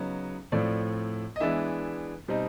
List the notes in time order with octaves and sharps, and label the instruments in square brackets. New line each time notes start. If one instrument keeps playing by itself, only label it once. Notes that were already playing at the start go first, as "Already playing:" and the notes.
Already playing: [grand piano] C#3 F#3 B3 D#4
A2 F3 A3 C4 D5
D#5
E3 G#3 B3 D4 E5
B2 G3 C4 D#4